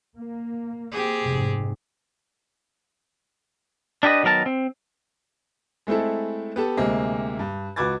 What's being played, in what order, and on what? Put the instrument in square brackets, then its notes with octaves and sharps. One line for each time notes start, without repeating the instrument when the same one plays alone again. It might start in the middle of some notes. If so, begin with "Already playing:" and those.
[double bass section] A#3
[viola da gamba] C4 G4 G#4
[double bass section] F1 G#2
[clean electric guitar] D4 E4 G4 B4 D#5
D#3 F#3 B3 A#4 A5
C4
[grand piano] G#3 A3 C4 E4 A4
B3 G4 A4
D2 C3 G#3 A#3 C4
G2
C#2 F#4 B4 D6 G#6 A6